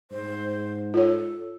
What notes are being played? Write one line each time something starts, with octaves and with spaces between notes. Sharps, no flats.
G#2 C5
F4 A4 C#5